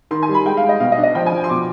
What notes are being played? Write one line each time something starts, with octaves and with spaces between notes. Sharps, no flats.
D#3 C6
G#5
G3
B5
G#3 G5
F5
G#3
D#5
B2 F5
D#5
D4
D#5
F3 G5
G#5
F3
C6
B2 D6